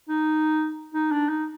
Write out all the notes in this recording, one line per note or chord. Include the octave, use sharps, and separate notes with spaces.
D#4
D#4
D4
D#4